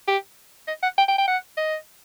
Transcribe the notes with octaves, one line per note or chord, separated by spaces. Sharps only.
G4
D#5
F#5
G5
G5
G5
F#5
D#5